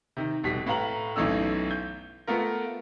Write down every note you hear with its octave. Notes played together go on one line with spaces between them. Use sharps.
C3 D#3
F1 B2 G3 B6
A2 B4 F5 A#5 F#7
B1 F#2 E3 A3 D#4 E6
G6
A3 B3 F4 A#4